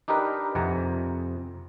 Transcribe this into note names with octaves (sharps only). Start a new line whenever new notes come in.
D4 D#4 G4 A#4 B4
F2 C3 F#5 G#5 A#5